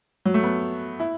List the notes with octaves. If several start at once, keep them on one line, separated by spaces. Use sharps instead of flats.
F#3
A3
B3
E4